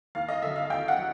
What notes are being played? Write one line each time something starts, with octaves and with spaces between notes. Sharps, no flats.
D#2 F5
D#5
D3 F#3 E5
F5
D#2 G5
F#5
F#3